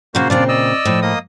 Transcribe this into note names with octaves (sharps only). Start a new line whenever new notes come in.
A#2 C#3 A#3 F#4 C5
A#2 C#3 C4 D4 F4 D5
D5 D#5 E6
A2 F3
A#3 D#5 D#6